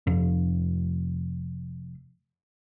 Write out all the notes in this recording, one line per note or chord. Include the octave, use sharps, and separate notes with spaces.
F1 F2